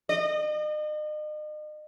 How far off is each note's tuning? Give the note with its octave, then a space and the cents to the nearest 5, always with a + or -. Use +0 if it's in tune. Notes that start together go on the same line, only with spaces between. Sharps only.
D#5 -40